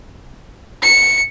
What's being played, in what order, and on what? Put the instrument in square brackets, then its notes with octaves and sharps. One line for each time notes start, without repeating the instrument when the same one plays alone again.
[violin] C#7